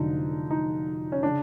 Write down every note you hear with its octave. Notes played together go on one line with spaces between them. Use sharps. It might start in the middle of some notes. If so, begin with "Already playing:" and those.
Already playing: F1 F2 D3 F#3 D#4
D#4
C#4
C#3 D4